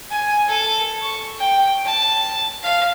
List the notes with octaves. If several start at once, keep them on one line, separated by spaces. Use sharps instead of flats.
G#5
A4
C#6
G5
A5
F5